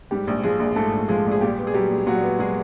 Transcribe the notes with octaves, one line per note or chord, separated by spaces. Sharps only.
G#2 G3 G4
A#1
F3 G#3 G#4
A#1
G#2 A3 A4
A#1
F3 G#3 G#4
A#1
G#4
A#2 G3 G4
B3
G#4
F#3 G3 G4
A#1
A#2 F#3 F#4
B3
F#3 G#3 G#4